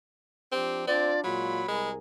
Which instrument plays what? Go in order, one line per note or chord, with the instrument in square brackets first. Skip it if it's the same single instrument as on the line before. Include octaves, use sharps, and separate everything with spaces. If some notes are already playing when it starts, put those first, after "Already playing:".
[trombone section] F3 D4 G4 [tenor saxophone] C4
[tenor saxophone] C4 [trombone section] D4 F4 [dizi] D5
[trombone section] A#2 G#3 F4 [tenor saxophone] F#3 [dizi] B5
[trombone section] C2 G#4 A#4 [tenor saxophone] G#3